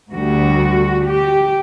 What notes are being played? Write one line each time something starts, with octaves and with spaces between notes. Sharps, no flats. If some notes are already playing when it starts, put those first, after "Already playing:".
D2 D3 G3 F#4
G4